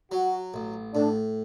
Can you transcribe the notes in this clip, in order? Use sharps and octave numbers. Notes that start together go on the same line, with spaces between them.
F#3 F#4
A1
A2 D4